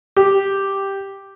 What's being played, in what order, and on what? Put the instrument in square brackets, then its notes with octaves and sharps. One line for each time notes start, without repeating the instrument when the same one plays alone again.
[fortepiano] G4